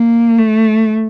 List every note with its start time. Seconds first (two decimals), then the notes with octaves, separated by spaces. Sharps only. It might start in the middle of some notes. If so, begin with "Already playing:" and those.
Already playing: A#3
0.38 A3